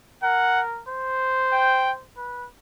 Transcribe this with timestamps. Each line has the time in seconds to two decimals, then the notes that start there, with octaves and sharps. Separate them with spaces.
0.23 A#4 F#5
0.88 C5
1.53 G5
2.17 B4